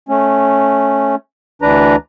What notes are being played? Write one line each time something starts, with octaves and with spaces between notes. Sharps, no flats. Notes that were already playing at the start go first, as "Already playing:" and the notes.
A3 C#4
D2 E3 D4 B4 A#5